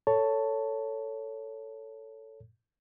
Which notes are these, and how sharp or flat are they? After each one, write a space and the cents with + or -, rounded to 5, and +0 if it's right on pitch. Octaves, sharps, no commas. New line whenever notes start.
A4 +10 C#5 +10 A5 +10